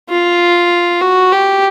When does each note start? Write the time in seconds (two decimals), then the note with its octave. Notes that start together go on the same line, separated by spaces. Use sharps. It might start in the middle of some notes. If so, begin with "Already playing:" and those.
0.09 F4
1.01 F#4
1.32 G4